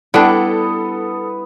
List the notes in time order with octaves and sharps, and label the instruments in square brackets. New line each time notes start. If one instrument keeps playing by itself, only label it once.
[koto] G3 D4 [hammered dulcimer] B3 [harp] E4 [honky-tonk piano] A4